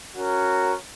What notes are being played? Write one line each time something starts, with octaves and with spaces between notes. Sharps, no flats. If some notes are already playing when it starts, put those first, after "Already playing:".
C#4 F#4 A#4